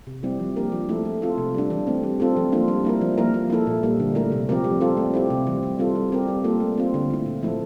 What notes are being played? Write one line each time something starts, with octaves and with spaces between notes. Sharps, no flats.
C3
G3 C4 E4 G4
F3
A#3 D4 G4 A#4
F3
A3 E4 A4
A3
C4 F4 A4
C3
G3 D4
E3
A3 C4
G3
C4 F4 A4
F3
A#3 D4 F4
G3
A#3 E4 A#4
F3
A#3 E4 A#4
F3
A#3 E4 A4
A#2
G3 A#3
D3
A3 E4 A#4
C3
F3 C4 G4 A#4
G3
C4 F4 A4
A3
C4 E4 G4
C3
E3 G3
E3
G3 C4 F4 A4
G3
C4 G4 A#4
G3
A#3 F4 A4
A3
C4 F4
D3
A3 E4
A#2
F3 A3 E4 A4